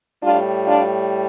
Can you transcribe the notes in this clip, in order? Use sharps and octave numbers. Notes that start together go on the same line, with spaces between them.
A2 G3 D4 F4
D4 F4